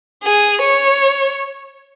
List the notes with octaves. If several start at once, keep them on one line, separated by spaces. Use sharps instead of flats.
G#4
C#5